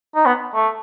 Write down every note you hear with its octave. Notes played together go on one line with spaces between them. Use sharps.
D#4
B3
A3